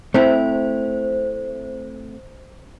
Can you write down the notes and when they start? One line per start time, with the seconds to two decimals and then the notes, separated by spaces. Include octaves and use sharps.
0.14 A3 C4 E4 C5